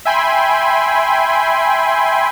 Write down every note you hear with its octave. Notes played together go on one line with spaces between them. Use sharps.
E5 G5 G#5 B5 C6